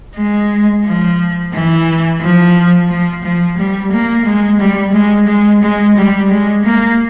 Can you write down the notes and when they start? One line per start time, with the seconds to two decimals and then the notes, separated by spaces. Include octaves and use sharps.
0.16 G#3
0.85 F3
1.53 E3
2.21 F3
2.89 F3
3.24 F3
3.58 G3
3.92 A#3
4.25 G#3
4.60 G3
4.93 G#3
5.27 G#3
5.62 G#3
5.97 G3
6.31 G#3
6.64 A#3